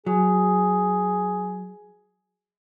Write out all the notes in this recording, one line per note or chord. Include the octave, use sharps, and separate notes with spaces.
F#3 G#4